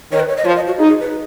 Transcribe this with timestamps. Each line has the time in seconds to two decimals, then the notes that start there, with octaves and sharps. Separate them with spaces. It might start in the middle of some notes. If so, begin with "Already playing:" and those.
0.12 D#3 C#5
0.20 B4
0.29 C#5
0.37 D#5
0.45 F3 C#5
0.56 D#5
0.67 F#4
0.78 D#4 G#4
0.89 G#4
1.00 B4